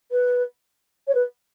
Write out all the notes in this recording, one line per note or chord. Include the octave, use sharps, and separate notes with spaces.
B4
C#5
B4